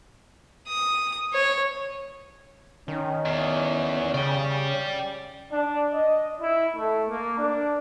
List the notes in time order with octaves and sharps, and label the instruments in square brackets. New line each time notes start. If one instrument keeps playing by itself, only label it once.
[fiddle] D#6
C#5
[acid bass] D#3 [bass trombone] C#4
[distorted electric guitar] E2
[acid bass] C#3 [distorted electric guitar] D5 G5
[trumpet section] D4
D#5
E4
A3
A#3
D4